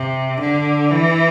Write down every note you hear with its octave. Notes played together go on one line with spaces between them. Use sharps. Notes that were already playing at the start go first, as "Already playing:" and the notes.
Already playing: C3
D3
E3